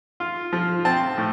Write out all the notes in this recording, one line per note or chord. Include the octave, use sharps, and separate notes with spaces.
F4
F3
C4 A5
A2